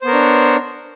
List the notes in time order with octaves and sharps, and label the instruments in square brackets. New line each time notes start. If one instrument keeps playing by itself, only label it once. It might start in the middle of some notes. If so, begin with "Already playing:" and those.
[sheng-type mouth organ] C5
B3
A#4
C#5
D4